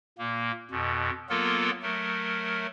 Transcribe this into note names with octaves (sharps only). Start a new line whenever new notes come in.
A#2 A#3
F2 B2
F#3 A#3 B3 F4 A4 A#4
F#3 A3 A#4